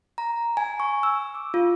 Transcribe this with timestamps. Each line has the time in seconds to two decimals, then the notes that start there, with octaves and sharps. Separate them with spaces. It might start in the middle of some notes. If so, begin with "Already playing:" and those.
0.18 A#5
0.57 G#5
0.80 C#6
1.03 E6
1.35 D6
1.54 F4